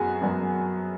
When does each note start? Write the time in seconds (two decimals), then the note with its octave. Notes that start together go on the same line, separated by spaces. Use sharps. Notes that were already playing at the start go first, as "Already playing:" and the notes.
Already playing: F#2 F#3 B3 F#4 G#4 G#5
0.22 F#2 F#3 B3